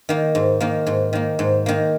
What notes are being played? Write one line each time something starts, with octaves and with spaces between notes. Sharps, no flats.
D#3 A#3
G#2
D#3 A#3
G#2
D#3 A#3
G#2
D#3 A#3